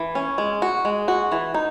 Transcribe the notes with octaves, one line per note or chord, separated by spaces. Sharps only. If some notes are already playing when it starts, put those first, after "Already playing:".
Already playing: E3
C#4
G#3
F#4
G#3
F#4
E3
D#4